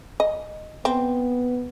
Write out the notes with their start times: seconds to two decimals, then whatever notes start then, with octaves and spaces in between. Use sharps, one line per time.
0.20 D#5
0.85 B3 C4